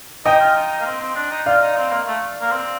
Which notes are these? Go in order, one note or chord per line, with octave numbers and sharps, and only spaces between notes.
D#4 D#5 G5
F4
D#4
A#3
C4
C4
D4
D#4
F4 D5 F5
D#4
C4
A#3
A3
A#3
C4